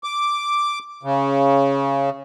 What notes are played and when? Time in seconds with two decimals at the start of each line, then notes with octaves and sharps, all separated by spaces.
0.04 D6
1.03 C#3